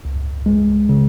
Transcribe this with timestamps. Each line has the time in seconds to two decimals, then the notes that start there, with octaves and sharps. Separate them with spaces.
0.05 C#2
0.46 G#3
0.89 C#3